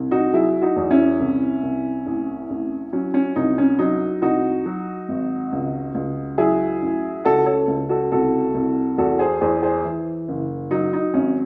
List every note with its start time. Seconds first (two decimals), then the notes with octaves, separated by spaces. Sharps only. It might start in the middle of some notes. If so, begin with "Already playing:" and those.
Already playing: C2
0.11 D#4 F#4
0.33 F#3 E4 G#4
0.61 D#4 F#4
0.76 E2
0.91 C#4 E4
1.20 C2
1.63 C2
2.06 A1
2.50 A1
2.93 F#3 C#4
3.14 C#4
3.36 C2 D#4
3.58 C#4
3.79 F#3 D#4
4.22 C2 D#4 F#4
4.66 F#3
5.09 G#1
5.53 C#2
5.95 C#2
6.38 F#3 E4 G#4
6.82 A1
7.25 C#2 F#4 A4
7.46 A4 C#5
7.68 C#2
7.89 F#4 A4
8.12 C2 F#4 A4
8.54 C2
8.98 E2 F#4 A4
9.19 G#4 C5
9.41 E2 G#4 C5
9.63 G#4 C5
9.85 E3
10.28 F#1
10.71 F#3 D#4
10.93 D#4
11.14 G#1 C#4